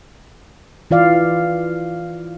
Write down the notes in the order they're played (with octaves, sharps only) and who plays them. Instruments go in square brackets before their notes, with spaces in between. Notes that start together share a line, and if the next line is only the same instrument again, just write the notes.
[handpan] E3 F4 D5 F5